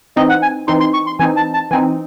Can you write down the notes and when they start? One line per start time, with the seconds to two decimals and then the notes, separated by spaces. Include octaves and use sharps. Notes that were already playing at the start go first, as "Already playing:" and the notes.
0.16 E3 C4 D#4 D#5
0.29 F#5
0.42 G#5
0.68 E3 C4 D#4 C6
0.80 C6
0.94 C#6
1.07 C6
1.19 E3 C4 D#4 G#5
1.36 A5
1.54 A5
1.71 E3 C4 D#4 G#5